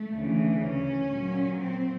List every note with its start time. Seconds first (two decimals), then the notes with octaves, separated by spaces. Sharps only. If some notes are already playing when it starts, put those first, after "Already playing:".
Already playing: A3
0.14 D2 C#3 E3
0.63 C#4
1.10 A#2 F#3
1.59 C4